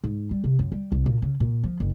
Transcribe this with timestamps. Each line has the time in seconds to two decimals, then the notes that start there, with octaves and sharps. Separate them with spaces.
0.04 G#2
0.31 G3
0.44 C3
0.59 F#2
0.72 G3
0.92 C2
1.06 A#2
1.22 C#3
1.40 A#2
1.64 F3
1.80 F#1